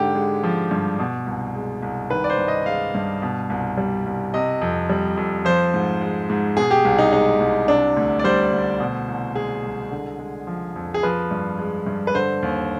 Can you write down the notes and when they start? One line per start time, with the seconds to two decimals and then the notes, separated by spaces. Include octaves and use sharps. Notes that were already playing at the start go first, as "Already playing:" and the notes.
Already playing: G#2 D3 G4
0.15 G#3
0.43 F3
0.71 G2
0.99 B2
1.26 C2
1.55 G#3
1.82 C2
2.10 D#3 B4
2.24 D5
2.30 C5
2.38 G2
2.48 D#5
2.66 G#3 F5
2.95 G2
3.22 B2
3.50 C2
3.78 G3
4.06 C2
4.34 C3 D#5
4.61 F2
4.89 G3
5.17 F2
5.45 F3 C5
5.74 G#2
6.01 G#3
6.30 G#2
6.57 B2 G#4
6.71 G4
6.85 C2
6.99 D#4
7.13 G#3 D#4
7.40 C2
7.68 C3 D4
7.97 D2
8.19 D5
8.24 G3 C5
8.52 D2
8.80 B2
9.08 C2
9.36 G#3 G#4
9.63 C2
9.91 D3
10.19 G#3
10.47 F3
10.76 F2
10.94 G#4
11.03 F3 B4
11.31 G2
11.59 G#3
11.87 G2
12.07 B4
12.14 D3 C5
12.43 D#2